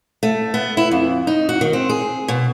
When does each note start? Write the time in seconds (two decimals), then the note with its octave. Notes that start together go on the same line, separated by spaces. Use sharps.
0.23 A3
0.54 B3
0.77 E4
0.91 F2
1.27 D#4
1.49 F#4
1.61 D#3
1.73 C4
1.89 G#4
2.28 B2